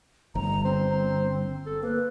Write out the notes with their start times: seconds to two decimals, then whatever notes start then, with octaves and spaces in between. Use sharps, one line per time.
0.35 G1 A#5
0.65 C4 C5
1.66 A4
1.83 A#3 B4